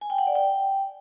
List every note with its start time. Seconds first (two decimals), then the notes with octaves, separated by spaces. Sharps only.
0.01 G#5
0.10 G5
0.18 F#5
0.27 D5
0.36 G5